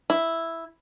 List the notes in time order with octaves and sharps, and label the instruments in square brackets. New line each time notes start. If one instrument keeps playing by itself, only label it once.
[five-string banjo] E4